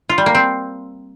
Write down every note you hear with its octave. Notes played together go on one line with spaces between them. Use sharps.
F4
G3
A#3
C4